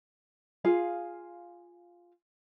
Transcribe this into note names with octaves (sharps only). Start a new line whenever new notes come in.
F4 G#4 F5